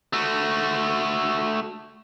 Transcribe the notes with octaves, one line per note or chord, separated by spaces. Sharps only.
A3 F#4